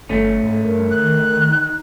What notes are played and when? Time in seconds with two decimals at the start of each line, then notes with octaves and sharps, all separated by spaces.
0.09 G1 A3 C#4 A4
0.43 G#2
0.64 G2 A#4
0.91 D#3 F#6
1.49 D#4